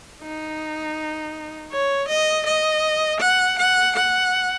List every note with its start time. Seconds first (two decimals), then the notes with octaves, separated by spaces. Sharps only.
0.22 D#4
1.72 C#5
2.08 D#5
2.46 D#5
3.20 F#5
3.58 F#5
3.95 F#5